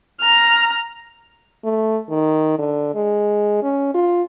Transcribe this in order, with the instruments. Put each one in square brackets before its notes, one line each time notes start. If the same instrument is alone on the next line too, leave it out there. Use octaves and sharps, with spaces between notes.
[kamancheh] A#5 F6
[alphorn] A3
D#3
D3
G#3
C#4
F4